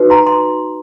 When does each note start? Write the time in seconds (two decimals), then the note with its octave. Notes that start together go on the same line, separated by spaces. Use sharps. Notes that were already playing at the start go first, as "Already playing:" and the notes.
Already playing: D#4 F#4 B4
0.10 A#5 C6
0.27 C6